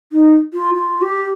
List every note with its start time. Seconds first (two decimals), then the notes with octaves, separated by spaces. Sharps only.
0.13 D#4
0.54 F4
0.75 F4
1.02 G4